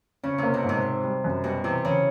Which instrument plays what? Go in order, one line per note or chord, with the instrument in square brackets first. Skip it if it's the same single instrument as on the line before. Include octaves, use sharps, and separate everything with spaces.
[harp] C#3 [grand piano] C#4
[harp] C3 [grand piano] A#3
[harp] B2
[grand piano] G#2
[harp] C3
[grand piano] C4
G3
F#2
[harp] B2 [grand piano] G3
[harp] C3 [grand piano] E3
[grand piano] E2 [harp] C#3